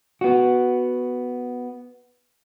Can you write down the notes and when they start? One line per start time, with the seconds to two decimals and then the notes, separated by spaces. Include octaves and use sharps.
0.21 B3 F#4